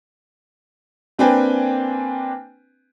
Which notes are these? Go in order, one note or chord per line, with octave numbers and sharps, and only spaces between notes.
A#3 C4 D4 B4 G5 G#5